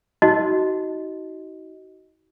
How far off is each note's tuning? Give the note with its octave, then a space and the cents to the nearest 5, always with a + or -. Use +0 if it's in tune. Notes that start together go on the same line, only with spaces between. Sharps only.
D#4 +45 F#4 +30 D#5 +5